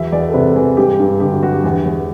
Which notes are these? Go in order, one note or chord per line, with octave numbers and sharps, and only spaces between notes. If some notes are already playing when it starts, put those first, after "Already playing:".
Already playing: E2 F#3 E5
E2 D5
D5
A4
C3 B4
E3
G2 G4
G2
D3 G4
F#4
F#3 F#4
G4
E2
E2